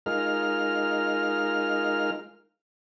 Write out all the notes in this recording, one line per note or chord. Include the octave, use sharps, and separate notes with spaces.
G#3 D#4 F4 A#4 F6